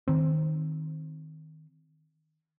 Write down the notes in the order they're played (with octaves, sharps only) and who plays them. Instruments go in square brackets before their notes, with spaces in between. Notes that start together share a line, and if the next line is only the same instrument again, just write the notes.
[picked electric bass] D#3 C4